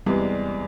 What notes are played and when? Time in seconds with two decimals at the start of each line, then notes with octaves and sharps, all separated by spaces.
0.06 E2 C3 E3 G3 G#3